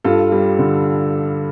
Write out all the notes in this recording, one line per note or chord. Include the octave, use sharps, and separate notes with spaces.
G2 F4 A4
G3
D3